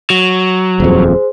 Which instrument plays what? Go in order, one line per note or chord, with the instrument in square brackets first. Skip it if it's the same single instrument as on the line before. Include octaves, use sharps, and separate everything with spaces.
[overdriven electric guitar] F#3
[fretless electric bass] D#1 F2 [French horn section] G#4 C5